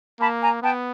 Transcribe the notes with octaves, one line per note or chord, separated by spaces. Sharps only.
A#3 A5 B5
G#5 A#5
B3 G5 A5